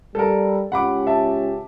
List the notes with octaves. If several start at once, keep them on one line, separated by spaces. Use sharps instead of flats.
G3 A4 A#4
C#2 C#4 G4 F#5 B5 D6
E5 A5